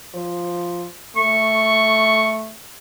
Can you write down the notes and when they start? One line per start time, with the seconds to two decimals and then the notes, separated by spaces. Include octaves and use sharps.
0.14 F3
1.16 A3 C#6